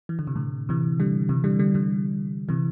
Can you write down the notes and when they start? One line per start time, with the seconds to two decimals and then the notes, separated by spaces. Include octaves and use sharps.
0.09 E3
0.19 D3
0.27 C3
0.35 A2 D3
0.69 C3 E3
1.00 D3 G3
1.29 C3 E3
1.44 D3 G3
1.59 D3 G3
1.74 D3 G3
2.49 C3 E3